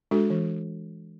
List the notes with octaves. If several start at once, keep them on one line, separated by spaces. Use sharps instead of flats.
G#3 D4 F#4 A4
E3